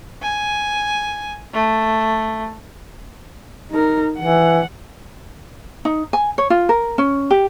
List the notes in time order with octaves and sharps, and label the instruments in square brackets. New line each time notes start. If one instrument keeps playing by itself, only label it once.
[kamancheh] G#5
A3
[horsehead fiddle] D#4 A#4
[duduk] E3 [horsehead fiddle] F#5
[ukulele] D#4
G#5
C#5
F4
A#4
C#4
G4